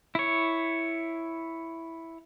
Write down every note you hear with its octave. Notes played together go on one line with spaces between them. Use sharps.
E4 C#5